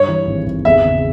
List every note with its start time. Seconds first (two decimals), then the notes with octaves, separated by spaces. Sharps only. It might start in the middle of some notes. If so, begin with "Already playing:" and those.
Already playing: G2 C#5
0.08 E3
0.27 G#1
0.46 G#1
0.65 E2 E5
0.84 C#3